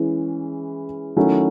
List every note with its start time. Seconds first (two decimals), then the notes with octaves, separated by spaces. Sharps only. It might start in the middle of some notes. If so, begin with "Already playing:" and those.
Already playing: E3 G#3 C#4 E4
1.17 D#3 F#3 A3 C#4 E4